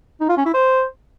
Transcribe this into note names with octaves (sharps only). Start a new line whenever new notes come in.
D#4
F4
C#4
E4
C5